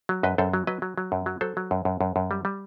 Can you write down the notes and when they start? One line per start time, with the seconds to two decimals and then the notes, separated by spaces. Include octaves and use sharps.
0.09 F#3
0.23 F#2 B4 D#5
0.38 F#2 A4 C5
0.54 F#3
0.67 F#3 B4 D#5
0.82 F#3
0.98 F#3
1.12 F#2
1.26 F#3
1.41 F#3 A4 C5
1.57 F#3
1.71 F#2
1.85 F#2
2.01 F#2
2.16 F#2
2.31 G3
2.45 G3